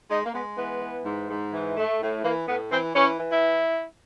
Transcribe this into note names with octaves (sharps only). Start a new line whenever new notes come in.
G#3 D#4
A#3
G#3 B3
E3 B3
E3
G#2
G#2
E3
A3
A2
E3 A#3
A2 B3
E3 C4
E3 C#4
E3
E4